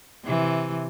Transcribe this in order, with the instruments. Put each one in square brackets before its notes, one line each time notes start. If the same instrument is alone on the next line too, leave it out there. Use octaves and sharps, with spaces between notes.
[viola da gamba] C3 E3